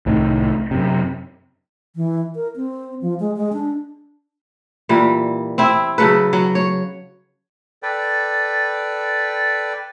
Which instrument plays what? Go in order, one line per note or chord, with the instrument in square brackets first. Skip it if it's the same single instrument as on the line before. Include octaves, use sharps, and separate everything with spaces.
[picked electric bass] C2 A2 D#3
F#2 C3
[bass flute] E3
A#4
C4
F3
G#3
G#3
D4
[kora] A#2 E3 G3
C4 E4
C#3 F#3 A4 B4
F#3
C#5
[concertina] A4 B4 D5 G5